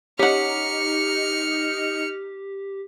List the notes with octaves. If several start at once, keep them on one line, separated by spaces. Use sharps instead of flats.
C#4 D#4 G4 F#5 F6 C#7